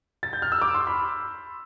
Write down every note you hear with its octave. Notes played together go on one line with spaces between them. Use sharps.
A6
G6
F6
E6
D6
C6
B5